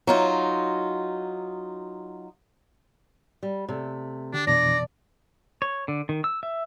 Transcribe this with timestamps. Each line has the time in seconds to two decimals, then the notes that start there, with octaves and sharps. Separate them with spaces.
0.07 F#3 D#4 F4
3.43 G3
3.69 C3 A3
4.34 D3 D4 G4
4.47 F2 B2 E3 D4 D5 A#6
5.62 C#5
5.88 D3
6.09 D#3
6.24 E6
6.43 E5